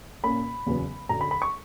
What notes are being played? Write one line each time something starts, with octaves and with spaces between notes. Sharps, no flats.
A#2 A#3 C#4 B5
E2 C#3 F#3 B3
F#2 D3 F#3 A#5
B5
B5
C#6